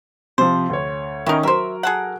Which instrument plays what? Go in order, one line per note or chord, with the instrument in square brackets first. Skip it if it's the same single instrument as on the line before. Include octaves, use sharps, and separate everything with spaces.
[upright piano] C3 F3 [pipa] C5
[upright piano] D2 C#5
[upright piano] D#3 C#4 D#4 [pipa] E4 A#4
[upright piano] F#3 A#4 [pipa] C5 E5
[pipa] G#4 A4 F#5